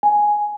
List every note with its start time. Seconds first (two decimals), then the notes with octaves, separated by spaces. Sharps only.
0.03 G#5